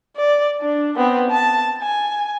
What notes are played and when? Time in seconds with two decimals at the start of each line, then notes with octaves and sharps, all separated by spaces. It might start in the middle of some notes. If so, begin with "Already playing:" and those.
0.16 D5
0.62 D4
0.97 B3 C4
1.30 A5
1.82 G#5